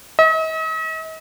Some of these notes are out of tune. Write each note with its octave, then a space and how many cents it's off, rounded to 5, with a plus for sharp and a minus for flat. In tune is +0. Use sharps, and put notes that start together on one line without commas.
D#5 +45